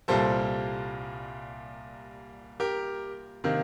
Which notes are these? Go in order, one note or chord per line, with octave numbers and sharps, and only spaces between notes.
C2 A#2 G3 A#3 A4 C5
G4 A#4
C3 D#3 A#3